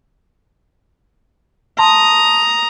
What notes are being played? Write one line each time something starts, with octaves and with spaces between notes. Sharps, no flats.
A5 A#5 C6 D#6